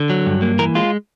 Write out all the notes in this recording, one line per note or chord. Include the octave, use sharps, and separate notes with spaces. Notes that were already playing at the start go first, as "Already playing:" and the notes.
Already playing: D3
F#3
G2
A#3
E3 A#4
G#3 F4